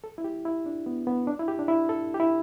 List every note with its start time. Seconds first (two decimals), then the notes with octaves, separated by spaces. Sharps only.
0.04 A4
0.18 E4
0.24 G4
0.45 E4
0.66 D4
0.86 B3
1.07 B3
1.27 D4
1.39 E4
1.48 G4
1.59 D4
1.68 E4
1.89 A4
2.14 G4
2.20 E4